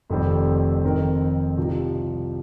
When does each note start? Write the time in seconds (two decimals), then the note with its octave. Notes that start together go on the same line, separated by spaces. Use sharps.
0.10 F1 F2 D#3 G3 C4
0.84 F2 D#3 C4 D#4 A#4
1.57 C2 C3 F3 D#4 G4